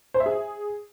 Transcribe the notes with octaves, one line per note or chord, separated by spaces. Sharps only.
C5
E5
G#4